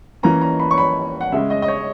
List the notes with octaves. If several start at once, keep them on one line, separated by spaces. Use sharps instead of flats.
E3 A#3 C#4 A#5
A#5
B5
C#6
B5
F#5
C#3 G#3 C#4 E5
D#5
D#5
C#5